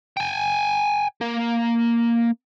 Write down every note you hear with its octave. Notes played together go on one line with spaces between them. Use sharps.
G5 G#5
A#3